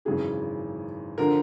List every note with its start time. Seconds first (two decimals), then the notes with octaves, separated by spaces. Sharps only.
0.05 G#1 F#2 C#3 E3 G#4
1.18 D3 F3 A#4